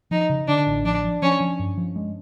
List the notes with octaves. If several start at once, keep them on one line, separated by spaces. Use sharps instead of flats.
F3 D#4
C#3
D3 D4
A1
F3 D4
F3
F3 C#4
F3
G2
F3
G#3